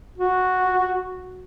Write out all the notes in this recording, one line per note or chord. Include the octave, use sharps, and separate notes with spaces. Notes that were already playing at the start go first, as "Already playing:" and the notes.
F#4